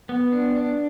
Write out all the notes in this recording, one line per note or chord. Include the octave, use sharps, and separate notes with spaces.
B3
D4
D4